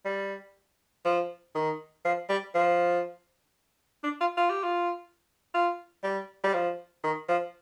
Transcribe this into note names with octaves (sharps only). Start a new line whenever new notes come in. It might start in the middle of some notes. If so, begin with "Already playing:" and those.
G3
F3
D#3
F3
G3
F3
D4
F4
F4
G4
F4
F4
G3
G3
F3
D#3
F3